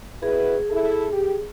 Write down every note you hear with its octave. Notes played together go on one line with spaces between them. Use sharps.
B2 E4 G#4 B4
E4 A4
G4